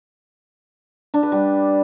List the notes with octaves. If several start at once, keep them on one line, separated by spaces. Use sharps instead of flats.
D4
B4
G3